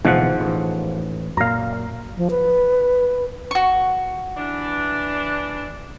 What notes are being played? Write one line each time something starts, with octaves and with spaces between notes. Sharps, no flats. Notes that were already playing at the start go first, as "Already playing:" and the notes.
D1 G#2 B2 E3 F3 F#5
A1
F#2 A#2 F5 A#5
F3
B4
F#4 C#6
E3 D4